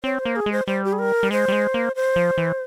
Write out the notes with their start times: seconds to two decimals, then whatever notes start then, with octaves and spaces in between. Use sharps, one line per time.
0.04 C4 C#5
0.19 C5
0.25 A#3
0.36 G#4
0.46 G#3
0.52 C5
0.67 G3 C5
0.84 G4
0.93 G#4
0.99 A#4
1.23 G3
1.31 G#3 C5
1.48 G3
1.52 G#3
1.74 A#3
1.96 C5
2.16 F3
2.37 E3